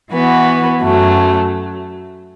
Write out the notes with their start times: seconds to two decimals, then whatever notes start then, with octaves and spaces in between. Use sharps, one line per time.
0.12 E3 B3 F#4
0.82 F#2 F#3 A3